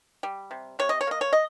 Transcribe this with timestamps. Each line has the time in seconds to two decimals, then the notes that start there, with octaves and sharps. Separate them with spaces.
0.23 G3
0.51 C3
0.79 C3 C#5
0.89 D#5
1.01 C#5
1.07 A#3 D#5
1.21 C#5
1.33 D#5